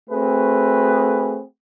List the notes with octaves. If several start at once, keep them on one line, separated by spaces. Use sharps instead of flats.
A3 C4 F#4 G#4 B4